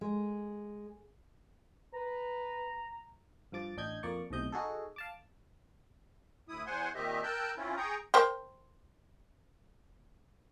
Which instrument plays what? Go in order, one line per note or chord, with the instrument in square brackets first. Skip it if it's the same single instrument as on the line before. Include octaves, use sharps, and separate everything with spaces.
[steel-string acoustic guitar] G#3
[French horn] B4 [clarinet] A#5
[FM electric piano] G2 F3 D6 A6
A1 D4 D#5 G6 G#6
F2 A#3 D5 C#6
B1 A2 C3 D#5 G6
D#4 F#4 G#4 A4
F5 A5 D6
[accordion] D2 E4 D#6
E2 C5 F#5 G#5 C6
A#2 D#3 C4 G4 D#5 E5
A#4 G5 A5 E6 F#6 G6
C4 C#4 E4 F4
G#4 G5 A#5 C#6 D#6
[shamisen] A#4 C5 G5